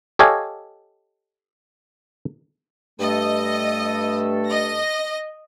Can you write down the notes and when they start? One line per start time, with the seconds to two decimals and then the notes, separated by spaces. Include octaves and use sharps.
0.19 G4 A4 C#5 D#5 F5 G#5
2.99 G2 A3 A4 D#5
4.48 D#5 A#6